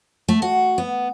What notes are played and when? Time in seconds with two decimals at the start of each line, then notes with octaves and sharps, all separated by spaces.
0.28 A3
0.42 F#4
0.78 B3